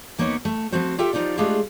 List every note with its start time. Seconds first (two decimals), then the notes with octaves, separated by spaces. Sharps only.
0.18 D#2 A#3 B3 D#4 C#5
0.45 A3
0.72 F3 A3 C4 F#4 C5
0.98 F4 G4 A4 E5 G5
1.13 F3 D#4 F4 G4 D5
1.38 G#3 A3 D4 F4 G4 G#4